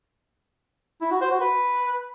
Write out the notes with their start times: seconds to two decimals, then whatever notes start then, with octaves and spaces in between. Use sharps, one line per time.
1.01 E4
1.11 F#4
1.21 C5
1.31 F#4
1.41 B4